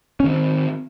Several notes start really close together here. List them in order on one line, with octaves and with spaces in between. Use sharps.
C#4 D#3 C4